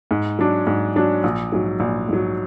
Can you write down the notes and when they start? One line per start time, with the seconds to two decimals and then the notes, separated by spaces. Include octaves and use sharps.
0.11 G#2
0.39 F#3 D4
0.67 G#2
0.96 F#3 D4
1.24 A#1
1.52 G#2 F#3
1.80 A#1
2.09 G#2 F#3